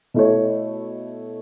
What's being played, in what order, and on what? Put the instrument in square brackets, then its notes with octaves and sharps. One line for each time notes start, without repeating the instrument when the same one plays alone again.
[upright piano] B2 A3 E4 A4 C#5